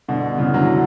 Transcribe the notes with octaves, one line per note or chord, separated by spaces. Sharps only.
B2 D3
C#3 E3
D3 F#3